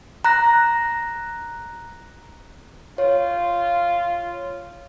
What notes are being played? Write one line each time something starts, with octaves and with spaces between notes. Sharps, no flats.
A#5 F#6 A#6
F4 C#5